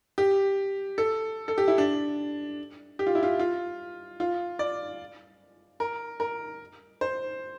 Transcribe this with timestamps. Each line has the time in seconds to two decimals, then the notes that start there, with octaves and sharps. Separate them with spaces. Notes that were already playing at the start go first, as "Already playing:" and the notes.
0.18 G4
0.98 A4
1.48 A4
1.58 G4
1.68 E4
1.78 D4
2.99 G4
3.07 F4
3.15 E4
3.23 F4
3.40 F4
4.20 F4
4.59 D5
5.80 A#4
6.20 A#4
7.01 C5